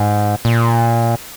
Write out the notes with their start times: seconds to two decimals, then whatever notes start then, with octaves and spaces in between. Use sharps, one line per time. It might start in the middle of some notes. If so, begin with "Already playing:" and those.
Already playing: G#2
0.45 A#2